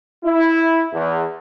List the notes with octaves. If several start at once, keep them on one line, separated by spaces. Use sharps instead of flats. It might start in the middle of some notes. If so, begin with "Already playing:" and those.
E4
E2